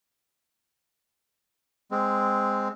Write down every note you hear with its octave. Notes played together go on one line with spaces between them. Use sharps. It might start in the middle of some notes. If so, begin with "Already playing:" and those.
G#3 C4